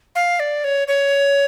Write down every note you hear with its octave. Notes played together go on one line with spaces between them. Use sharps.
F5
D5
C#5
C#5